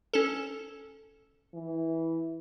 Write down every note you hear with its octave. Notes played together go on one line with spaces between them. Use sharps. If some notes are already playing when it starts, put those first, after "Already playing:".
C#4 A4
E3